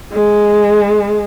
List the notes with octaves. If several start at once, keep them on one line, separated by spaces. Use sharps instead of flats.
G#3